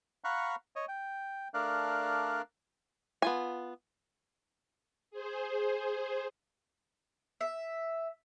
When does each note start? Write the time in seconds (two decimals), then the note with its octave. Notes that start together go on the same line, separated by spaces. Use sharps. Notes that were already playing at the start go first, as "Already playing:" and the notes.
0.24 F5 F#5 A#5 B5 C#6 F#6
0.76 C#5 D#5
0.88 G5
1.54 A3 D4 A#4 D5 F5 F#6
3.22 B3 F4 G#5
5.11 G#4 C5
7.41 E5